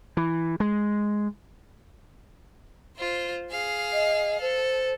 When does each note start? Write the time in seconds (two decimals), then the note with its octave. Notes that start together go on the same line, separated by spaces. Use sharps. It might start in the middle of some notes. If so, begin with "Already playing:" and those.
0.17 E3
0.60 G#3
2.98 F4 C5
3.52 G#4 F5
3.93 D#5
4.41 A4 C5